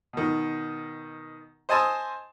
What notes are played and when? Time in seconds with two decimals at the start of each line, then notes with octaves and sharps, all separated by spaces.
0.13 B2 D#3
1.69 C5 D#5 G#5 A5 D#6 E6